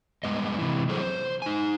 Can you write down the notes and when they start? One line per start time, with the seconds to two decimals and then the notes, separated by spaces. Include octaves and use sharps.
0.24 G2 C#3 G#3 B3 D#5
0.58 C3 E3
0.89 F#3 G#4 A4 C5
1.01 C5
1.42 D#4 G#5